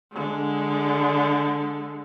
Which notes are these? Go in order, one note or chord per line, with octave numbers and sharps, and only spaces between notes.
D3 G#3